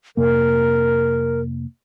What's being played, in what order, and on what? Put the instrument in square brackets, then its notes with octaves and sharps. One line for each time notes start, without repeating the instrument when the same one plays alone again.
[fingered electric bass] F2 C3 A#3 [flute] A#4